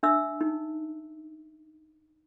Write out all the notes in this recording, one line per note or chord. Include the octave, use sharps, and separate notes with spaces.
D4 E5 E6
D#4